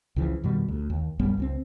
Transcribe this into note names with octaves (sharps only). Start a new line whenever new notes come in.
C#2 C#3 E3 F3
F2 B2 D#3 G3
D2
D#2
A#1 F#2 G3 B3
C#2 F3 C4